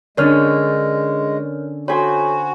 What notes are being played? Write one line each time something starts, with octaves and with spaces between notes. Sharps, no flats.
D3 G#3 C#4 D4 A#4 C#5 F6
F#4 A4 C5 C#5 G#5 B5